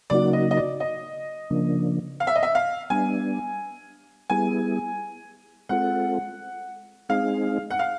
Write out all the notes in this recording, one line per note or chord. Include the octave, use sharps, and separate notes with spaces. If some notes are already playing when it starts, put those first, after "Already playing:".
C#3 F#3 A#3 D#4 F#4 D5
D#5
D#5
D5
D#5
C#3 F3 A#3 D4
F5
E5
D#5
E5
F5
G3 B3 D4 G#5
G3 B3 E4 G#4 G#5
G#3 C4 F4 A4 F#5
G#3 C4 D#4 G#4 F5
F#5
F5